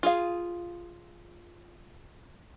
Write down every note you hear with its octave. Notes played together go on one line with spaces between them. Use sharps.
F4 G#4 F5